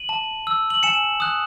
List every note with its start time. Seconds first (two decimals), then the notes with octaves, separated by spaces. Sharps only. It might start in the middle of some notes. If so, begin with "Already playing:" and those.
Already playing: D#7 F#7
0.09 A5
0.47 E6
0.70 F#7
0.83 G#5 C#7 E7
1.20 D#6 F#6